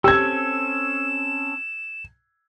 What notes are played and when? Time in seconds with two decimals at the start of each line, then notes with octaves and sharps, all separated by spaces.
0.04 C4 C#4 G4 A4 E6 G#6 E7